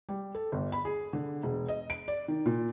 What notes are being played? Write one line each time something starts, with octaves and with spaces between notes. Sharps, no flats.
G3
A4
G1
B5
G#4
D3
E1
D#5
D7
D5
D#3
A#2